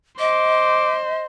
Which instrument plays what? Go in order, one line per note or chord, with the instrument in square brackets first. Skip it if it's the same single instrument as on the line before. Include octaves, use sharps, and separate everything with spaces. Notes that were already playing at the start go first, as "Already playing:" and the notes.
[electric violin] C5 [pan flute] D#5 [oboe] D6